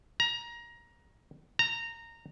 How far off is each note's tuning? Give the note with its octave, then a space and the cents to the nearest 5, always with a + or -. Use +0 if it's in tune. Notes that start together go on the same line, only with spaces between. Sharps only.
A#5 +20
A#5 -15